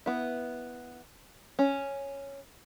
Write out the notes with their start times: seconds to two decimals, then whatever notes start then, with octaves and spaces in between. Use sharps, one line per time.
0.06 B3 E4
1.59 C#4